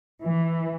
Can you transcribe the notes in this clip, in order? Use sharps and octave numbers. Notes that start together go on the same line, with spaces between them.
E3